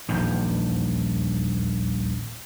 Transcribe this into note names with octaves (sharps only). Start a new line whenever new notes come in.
D#1 A#1 E2 D#3